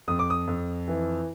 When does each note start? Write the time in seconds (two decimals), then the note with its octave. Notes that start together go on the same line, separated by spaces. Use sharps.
0.08 F2 D#6
0.19 D6
0.30 D#6
0.47 F2
0.88 E3